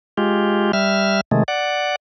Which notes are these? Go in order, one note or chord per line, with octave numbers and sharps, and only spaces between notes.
G#3 F4 G4
G3 E5 F6
C3 D#3 G#3 A3
D5 F#5